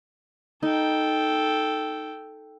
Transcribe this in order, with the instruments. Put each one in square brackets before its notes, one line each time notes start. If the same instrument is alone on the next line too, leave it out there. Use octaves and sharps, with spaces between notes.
[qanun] D#4 [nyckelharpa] A4 G5